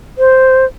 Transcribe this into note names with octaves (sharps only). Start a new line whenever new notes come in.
C5